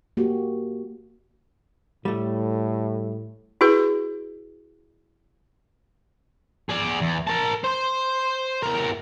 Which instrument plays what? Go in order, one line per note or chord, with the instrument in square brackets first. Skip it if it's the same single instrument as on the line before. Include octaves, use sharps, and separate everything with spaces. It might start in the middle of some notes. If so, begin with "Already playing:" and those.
[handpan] A#3 F#4 G4
[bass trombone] A2 [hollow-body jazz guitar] G3 A3
[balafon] E4 F#4 G#4 B4
[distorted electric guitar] G#4 D5
E2
A#4 A5
C5 C6
E2 A#4